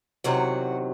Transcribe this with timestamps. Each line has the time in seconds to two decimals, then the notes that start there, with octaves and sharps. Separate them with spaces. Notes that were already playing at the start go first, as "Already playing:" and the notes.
0.24 E2 C3 D#3 F#3 F#4